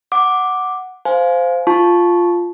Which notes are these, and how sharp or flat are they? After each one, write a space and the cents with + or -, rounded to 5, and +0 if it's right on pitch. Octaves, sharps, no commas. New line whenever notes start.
F#5 +0 D6 +0
C5 -15 F5 +0 G#5 +20
F4 +0 A5 -15 C#6 -5